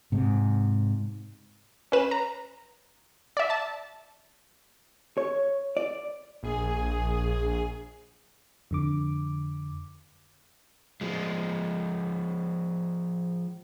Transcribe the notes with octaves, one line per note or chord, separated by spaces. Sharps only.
G#2 C3
C#4 B4 E7
A#5
D5 E5
A5
C#5
D5
A#1 G#4
F2 D3 D6
F3 G#3